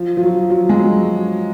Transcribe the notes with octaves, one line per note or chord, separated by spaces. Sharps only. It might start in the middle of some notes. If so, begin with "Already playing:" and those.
Already playing: F3
F3
F#3
F#3
G#3
F#3